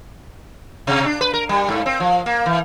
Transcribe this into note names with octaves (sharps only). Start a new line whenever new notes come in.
C3
D4
B4
A#4
G3
G#2
C4
F3
A#3
E3